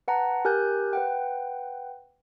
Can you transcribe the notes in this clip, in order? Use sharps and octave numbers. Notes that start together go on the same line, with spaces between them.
B4 F#5 A5 A#5
G4 A#4 G#5 F#6 G6
B4 F#5 G5